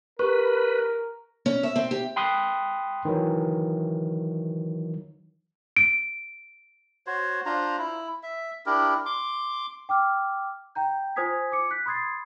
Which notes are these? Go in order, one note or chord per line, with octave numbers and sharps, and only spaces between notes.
G4 A#4 B4 C#6
C#4
E5
C4
G4
G5 B5 C6 D#6 F#6
D#3 E3 F#3
D7
F#4 C5 C#5
D4 F4 C5 A#5
E4
E5
D4 E4 G4 A#4
C6 D6
G5 D6 E6 F6
G5 A#5 G6
F4 C5 G#5 D#6 G#6 B6
D6 C#7
F#6 G6 B6
B5 C6 D#6 G#6 A6 C7